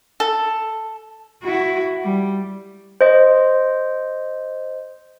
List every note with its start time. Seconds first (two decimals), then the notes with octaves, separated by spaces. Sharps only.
0.20 A4
1.43 E4 F#4
2.03 G3
3.01 C5 D#5